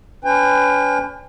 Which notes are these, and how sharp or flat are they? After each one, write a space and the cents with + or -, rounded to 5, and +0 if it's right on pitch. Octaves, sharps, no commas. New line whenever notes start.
C#4 +40 B4 +30 G5 +40